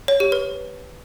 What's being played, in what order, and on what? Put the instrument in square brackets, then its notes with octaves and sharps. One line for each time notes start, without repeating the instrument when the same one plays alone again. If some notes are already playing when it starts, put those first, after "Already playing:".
[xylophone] C#5
G4
B4